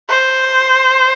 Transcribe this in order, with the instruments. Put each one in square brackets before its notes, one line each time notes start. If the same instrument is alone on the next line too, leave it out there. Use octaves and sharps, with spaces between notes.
[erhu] C5